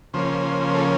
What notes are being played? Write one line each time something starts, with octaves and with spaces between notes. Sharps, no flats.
C#3 F3 A#3 C#4 C5
A4